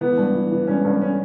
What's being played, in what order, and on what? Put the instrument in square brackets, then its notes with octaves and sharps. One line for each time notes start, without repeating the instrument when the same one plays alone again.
[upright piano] E3 B3
G2
E3
E3
G2 C#4
G2 C#4
C#4